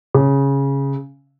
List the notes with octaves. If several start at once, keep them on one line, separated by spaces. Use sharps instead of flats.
C#3